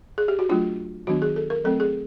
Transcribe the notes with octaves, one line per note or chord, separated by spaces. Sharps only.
G#4
G4
F#4
F#3 A3 D4 F4
D#3 F#3 B3 D4 F#4
G#4
A4
A#4
F#3 A3 C4 A4
G#4